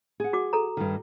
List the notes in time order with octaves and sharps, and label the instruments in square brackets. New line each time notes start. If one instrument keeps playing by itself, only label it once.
[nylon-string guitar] G#4 F#5
[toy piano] F#4 D6
A4 A#5
[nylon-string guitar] G2 D#3